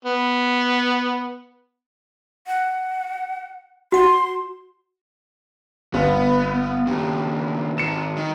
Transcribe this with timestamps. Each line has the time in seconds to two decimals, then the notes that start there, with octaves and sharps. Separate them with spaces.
0.05 B3
2.47 F#5
3.92 F#4 F#5 C6
5.94 G1 B3
6.87 D#2 C#3 G4
7.78 G#2 D#3 C#7 E7
8.17 D#3